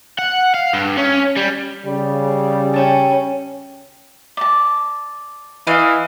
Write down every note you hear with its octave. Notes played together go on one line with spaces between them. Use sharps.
F#5
F5
G2
C#4
G3
C#3 G3
C#4 A4 E5 G5
D5 A5
E3 D#5 F5